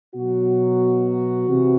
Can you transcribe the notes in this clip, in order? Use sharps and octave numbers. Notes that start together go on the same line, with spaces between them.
B2 F#3 F#4
C3 E3